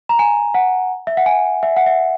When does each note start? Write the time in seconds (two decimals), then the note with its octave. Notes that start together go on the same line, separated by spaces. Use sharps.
0.09 A#5
0.19 G#5
0.54 F#5
1.07 E5
1.17 F#5
1.26 G#5
1.63 E5
1.76 F#5
1.86 E5